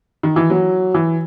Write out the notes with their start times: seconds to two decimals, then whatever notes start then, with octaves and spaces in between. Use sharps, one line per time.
0.23 D#3
0.36 E3
0.50 F#3
0.94 E3